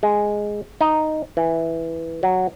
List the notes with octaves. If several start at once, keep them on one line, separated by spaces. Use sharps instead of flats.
G#3
D#4
E3
F#3